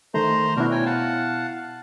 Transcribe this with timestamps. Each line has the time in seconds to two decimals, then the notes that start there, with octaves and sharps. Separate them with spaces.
0.14 D#3 A3 C5 A#5 C6
0.57 B2 D4 E4 F#4 A#4
0.71 C#5 G5 G#5
0.86 F5 F#5 A5